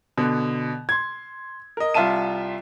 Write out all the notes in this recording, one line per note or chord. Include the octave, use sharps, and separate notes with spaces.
B2 D3
C6 G#6
A#4 D#5
C2 F4 E5 A5 D#7